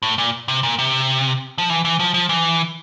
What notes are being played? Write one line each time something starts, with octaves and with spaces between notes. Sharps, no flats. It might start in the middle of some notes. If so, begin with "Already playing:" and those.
A2
A#2
C3
A#2
C3
F3
E3
E3
F3
F3
E3